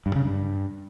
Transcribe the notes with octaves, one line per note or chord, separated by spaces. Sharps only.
G2
C#3
G2